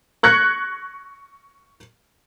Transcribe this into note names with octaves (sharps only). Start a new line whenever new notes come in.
C#6 F#6 G#6 A#6 C#7